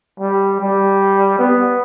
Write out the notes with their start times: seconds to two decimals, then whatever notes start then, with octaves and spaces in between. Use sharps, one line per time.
0.20 G3
0.61 G3
1.39 B3